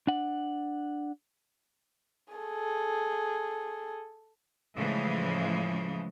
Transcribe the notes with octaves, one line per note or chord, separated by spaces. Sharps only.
D4 F#5
G#4 A4
A2 C#3 E3 F3 G#3